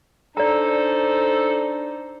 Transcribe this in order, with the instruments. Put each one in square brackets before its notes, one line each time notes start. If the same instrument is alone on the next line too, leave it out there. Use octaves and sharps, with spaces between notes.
[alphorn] D4 [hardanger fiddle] D#4 C5 [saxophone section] A4 [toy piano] D5 A#5